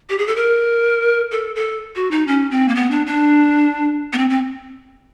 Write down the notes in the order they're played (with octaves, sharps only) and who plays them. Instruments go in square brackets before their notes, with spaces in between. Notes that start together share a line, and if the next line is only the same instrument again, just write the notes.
[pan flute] G4
G#4
A4
A#4
A4
A4
F#4
D#4
C#4
C4
A#3
B3
D4
D4
B3
C4
C4